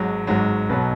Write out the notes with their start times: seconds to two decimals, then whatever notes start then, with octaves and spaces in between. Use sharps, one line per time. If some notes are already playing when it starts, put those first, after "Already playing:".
Already playing: G#1 G#2 F#3
0.27 G#1 G#2 F#3
0.69 B1 B2 F#3 B4